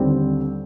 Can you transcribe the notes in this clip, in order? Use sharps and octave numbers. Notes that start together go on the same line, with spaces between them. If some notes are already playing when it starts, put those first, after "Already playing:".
Already playing: D#2 D3 G3 C4